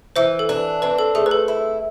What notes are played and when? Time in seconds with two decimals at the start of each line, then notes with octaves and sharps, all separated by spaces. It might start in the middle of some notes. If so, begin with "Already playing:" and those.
0.16 E3 C5
0.39 A4
0.49 D4 B4
0.82 C4 B4
0.99 A4
1.15 A3 G#4
1.26 B4
1.31 A4
1.48 E4